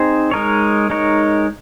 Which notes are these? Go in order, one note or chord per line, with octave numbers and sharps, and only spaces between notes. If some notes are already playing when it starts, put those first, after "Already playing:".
Already playing: C4 D#4 G#4 C5
G#3 D#4 A#4 C#5
G#3 D#4 A#4 C#5